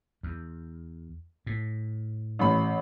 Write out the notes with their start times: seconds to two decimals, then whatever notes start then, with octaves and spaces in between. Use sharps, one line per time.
0.23 E2
1.46 A2
2.39 A1 B5